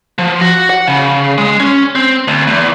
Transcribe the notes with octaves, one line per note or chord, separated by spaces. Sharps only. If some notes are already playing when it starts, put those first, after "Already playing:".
F3
F#4
F#5
C#3
G#3
C#4
C4
D2
E2